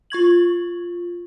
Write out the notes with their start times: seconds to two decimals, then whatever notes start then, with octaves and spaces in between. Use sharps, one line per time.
0.10 F4 C#6 G#6 F#7